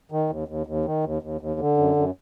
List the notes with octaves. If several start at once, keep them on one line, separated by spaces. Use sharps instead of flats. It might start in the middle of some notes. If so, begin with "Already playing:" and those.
D#3
D#2
D#2
D#2
D#3
D#2
D#2
D#2
D3
F#2
F#2